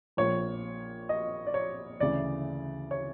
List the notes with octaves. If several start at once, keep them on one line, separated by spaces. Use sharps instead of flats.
A#1 A#2 C#5
D#5
D5
C#5
D2 C#3 E3 D5
C#5